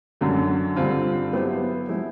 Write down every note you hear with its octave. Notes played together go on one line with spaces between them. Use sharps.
F#2 D3 F#3 A#3
G2 D3 G3 C4 F4
F#3 B3 E4 G4 C5
F3 G#3 B3 E4